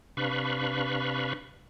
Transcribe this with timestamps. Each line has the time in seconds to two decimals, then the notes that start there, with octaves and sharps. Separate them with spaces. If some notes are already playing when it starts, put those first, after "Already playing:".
0.17 C3 D4 B4 F5 B5 C#6